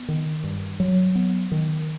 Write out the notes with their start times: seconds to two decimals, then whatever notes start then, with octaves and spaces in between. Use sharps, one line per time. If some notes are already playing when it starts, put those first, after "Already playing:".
Already playing: B3
0.08 D#3
0.44 G2
0.80 F#3
1.15 B3
1.52 D#3